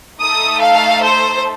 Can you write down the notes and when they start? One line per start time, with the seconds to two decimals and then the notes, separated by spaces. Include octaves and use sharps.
0.20 A3 D#4 A4 D#6
0.62 F5
1.02 C5